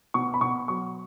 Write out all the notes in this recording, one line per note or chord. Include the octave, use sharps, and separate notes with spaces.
B2 C#6
B5
B2 C#6
F#3 C#6